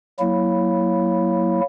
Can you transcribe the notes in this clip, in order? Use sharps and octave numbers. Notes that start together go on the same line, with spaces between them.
F#3 A#3 E4